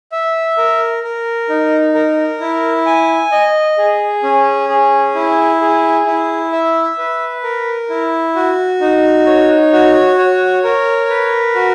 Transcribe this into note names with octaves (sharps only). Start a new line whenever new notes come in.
E5
A#4
A#4
D#4
A#4
E4
G#5
D#5
G#4
C#4
G#4
E4
G#4
E4
E5
B4
A#4
E4
F#4
D#4
C#5
F#4
C#5
A#4
B4
F#4